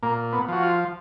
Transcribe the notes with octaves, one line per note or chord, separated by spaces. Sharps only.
A#2 A#3
B3
F3 F#4
F4